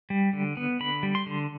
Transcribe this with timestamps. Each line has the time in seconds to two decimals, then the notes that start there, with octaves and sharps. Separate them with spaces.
0.10 G3
0.33 D3
0.57 B3
0.80 D3 B5
1.03 G3
1.15 C6
1.26 D3